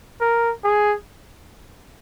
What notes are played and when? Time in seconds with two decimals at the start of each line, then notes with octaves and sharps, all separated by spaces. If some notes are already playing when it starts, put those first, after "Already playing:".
0.21 A#4
0.64 G#4